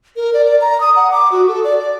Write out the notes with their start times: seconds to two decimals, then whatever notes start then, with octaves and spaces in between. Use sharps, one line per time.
0.16 A#4
0.34 D5
0.45 D5
0.61 A#5
0.80 D#6
0.96 F#5
1.11 D6
1.32 F#4
1.48 A4
1.64 D5
1.79 D5